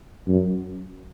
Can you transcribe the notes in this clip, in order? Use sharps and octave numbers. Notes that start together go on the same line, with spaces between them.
F#2